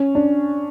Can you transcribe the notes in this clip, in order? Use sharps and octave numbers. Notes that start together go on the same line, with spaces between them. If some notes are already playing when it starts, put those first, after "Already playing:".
Already playing: C#4
D4